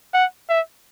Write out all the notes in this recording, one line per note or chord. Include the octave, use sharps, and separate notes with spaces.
F#5
E5